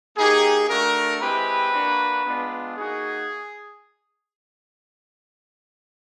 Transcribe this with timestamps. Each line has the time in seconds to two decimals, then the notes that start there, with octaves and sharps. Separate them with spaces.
0.16 A#3 D#4 G4 G#4
0.68 A3 D4 F#4 A#4
1.20 G#3 C4 E4 G4 B4
1.72 A#3 D4 F#4
2.25 G#3 B3 D4 F4
2.77 A#3 D#4 F#4 G#4